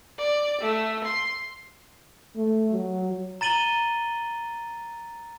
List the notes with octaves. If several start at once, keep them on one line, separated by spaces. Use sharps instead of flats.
D5
A3
C6
A3
F#3
A#5 A6 D#7 F#7 G7